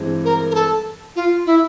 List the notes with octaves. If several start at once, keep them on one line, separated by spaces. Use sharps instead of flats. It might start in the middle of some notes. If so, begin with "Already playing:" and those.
Already playing: G2 E3 G#3 C4
A#4
A#4
A4
F4
E4